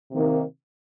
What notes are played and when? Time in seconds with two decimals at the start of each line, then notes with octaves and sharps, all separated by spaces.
0.12 C3 D#3 A#3